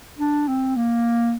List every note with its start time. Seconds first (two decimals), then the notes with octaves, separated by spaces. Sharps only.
0.19 D4
0.48 C4
0.76 A#3